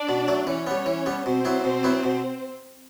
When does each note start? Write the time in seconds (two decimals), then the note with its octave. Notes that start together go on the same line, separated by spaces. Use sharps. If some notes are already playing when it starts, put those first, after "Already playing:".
Already playing: D4 D5
0.09 B2
0.28 F#3 A3
0.47 E3 C#4 C#5
0.67 G3 B3
0.86 E3
1.06 G3 B3
1.25 B2 C4 C5
1.45 F#3 B3 E4
1.64 B2
1.83 F#3 B3 E4
2.04 B2